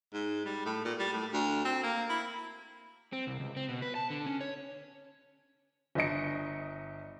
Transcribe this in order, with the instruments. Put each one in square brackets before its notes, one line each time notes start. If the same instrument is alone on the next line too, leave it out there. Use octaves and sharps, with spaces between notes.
[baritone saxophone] G#2
G3
A2
A#2
G3
A2
D2
C4
A#3
E4
[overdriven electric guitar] C4
C2
C#2
C4
B2
B4
A5
D3
C#4
C#5
[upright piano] G1 D4 D#5 C#7